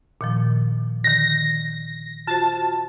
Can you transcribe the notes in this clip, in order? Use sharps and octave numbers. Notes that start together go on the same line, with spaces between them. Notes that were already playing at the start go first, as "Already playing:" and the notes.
A#2 D#3 F3
D3 D#3 A#6
F4 F#4 C5 A5